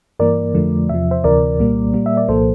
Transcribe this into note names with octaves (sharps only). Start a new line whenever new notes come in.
G2 E3 A#3 A#4 D5
F2 D3 F3 A3
E2 C3 F3 E5
C5 E5
D2 C3 E3 A#4 D5
C2 A#2 G3 A#3
A#2 G3 A#3
E5
D5
C2 A#2 F3 A#3 A4 C5